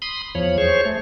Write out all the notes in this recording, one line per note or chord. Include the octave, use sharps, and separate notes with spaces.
B5 C6 D#6
E2 F3 C#5 B5
G#4 C5 C#5 C#6
A3